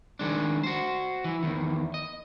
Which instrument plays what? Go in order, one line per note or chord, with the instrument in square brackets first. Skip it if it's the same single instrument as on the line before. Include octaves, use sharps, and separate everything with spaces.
[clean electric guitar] D#3 G#3 D4
F#4 C5
E3
E2 D#3
D#5